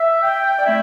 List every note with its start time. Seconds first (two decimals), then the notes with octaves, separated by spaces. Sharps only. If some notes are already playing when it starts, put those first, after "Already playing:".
Already playing: E5
0.23 G5
0.59 D5
0.65 A3 C4 E4 E5